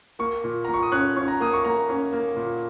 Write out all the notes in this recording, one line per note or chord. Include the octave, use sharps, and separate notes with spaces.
A#3 C#6
A#2
A#2 A#5
C#6
D#6
C#4 F#6
C#4
A#5
A#3 D#6
C#6
A#3 A#5
C#4
A#3
A#2